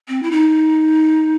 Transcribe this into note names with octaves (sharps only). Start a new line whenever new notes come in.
C4
E4
D#4